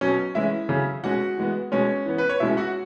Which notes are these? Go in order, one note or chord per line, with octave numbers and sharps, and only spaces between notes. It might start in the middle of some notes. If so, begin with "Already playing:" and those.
B2 F#3 C#4
E3 G#3 C#4 E4 E5
C#3 F#3 C#4
B2 G#3 C#4 F#4 F#5
E3 G#3 B3
B2 G#3 C#4 C#5
E3 B3
B4
C#5
B2 G#3 C#4 E4 E5
F#4 F#5